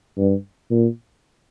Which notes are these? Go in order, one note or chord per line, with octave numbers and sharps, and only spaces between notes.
G2
A#2